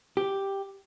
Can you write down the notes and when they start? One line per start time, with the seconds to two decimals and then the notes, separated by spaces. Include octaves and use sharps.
0.17 G4